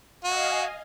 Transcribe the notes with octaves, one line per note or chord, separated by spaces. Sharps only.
F#4 D#5 F5 G#5